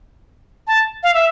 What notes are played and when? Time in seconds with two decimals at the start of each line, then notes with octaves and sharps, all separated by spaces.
0.67 A5
1.03 F5
1.14 E5